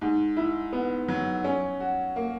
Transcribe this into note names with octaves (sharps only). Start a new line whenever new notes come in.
G#2
E4
B3
F#3
C#4
F#4
A#3